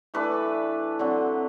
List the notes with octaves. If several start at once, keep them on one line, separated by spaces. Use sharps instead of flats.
E3 A3 D4 B4
D3 F#3 C4